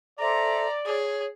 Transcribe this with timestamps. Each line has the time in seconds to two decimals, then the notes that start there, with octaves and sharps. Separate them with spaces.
0.19 A4 C5 D5 E5 A#5
0.85 G#4 C#5